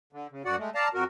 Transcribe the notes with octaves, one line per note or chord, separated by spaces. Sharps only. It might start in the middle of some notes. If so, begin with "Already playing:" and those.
D3
C#3
F#2 F#4 D5 F#5
G#3 A3
D5 F5 A5 A#5
F2 F#4 A#4